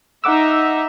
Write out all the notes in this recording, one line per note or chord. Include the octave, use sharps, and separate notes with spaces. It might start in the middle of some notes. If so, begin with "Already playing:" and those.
D#4 E5 F#5 D6 E6